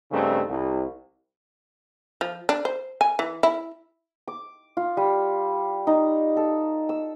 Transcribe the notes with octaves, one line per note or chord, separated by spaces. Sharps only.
G2 C#3 A3 C4 D#4
C2
F3
D4
C5
G#5
E3
E4
D6
F4
G3
D#4
A4
E6